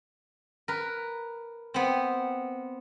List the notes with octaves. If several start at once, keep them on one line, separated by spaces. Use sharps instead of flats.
A#4 B4
B3 C4